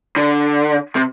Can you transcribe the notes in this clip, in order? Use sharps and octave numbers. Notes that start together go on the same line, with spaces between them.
D3
C3